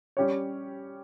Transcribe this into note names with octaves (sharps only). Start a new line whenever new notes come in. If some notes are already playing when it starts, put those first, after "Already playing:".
G3 C#4 G4 C#5